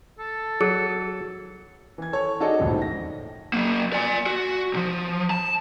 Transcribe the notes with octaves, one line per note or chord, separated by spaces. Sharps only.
A4
F#3 G#4 C#7
E3 G#6
A4 C#5
D#4 F#4 G#4 A4 D5 D#5
D1 A#1 F2 G#2
A#6
F#3 A#3
D5 G#5
F#4
C2 F3
A5